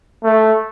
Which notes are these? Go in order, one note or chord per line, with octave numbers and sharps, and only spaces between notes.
A3